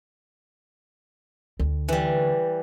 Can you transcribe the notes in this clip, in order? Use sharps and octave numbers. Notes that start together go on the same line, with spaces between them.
D2
E3 G3